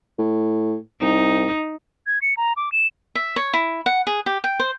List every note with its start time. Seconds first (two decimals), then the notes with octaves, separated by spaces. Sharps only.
0.18 A2
1.02 C2 D#4
2.07 G#6
2.22 C#7
2.37 A#5
2.57 D6
2.72 E7
3.15 E5
3.36 C#5
3.53 E4
3.86 F#5
4.07 G#4
4.26 G4
4.44 G5
4.59 C5